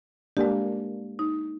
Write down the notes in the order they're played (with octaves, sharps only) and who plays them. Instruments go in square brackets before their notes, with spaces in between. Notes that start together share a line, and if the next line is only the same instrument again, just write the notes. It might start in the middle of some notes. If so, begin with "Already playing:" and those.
[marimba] G#3 G4 [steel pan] A#3 D4
[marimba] D#4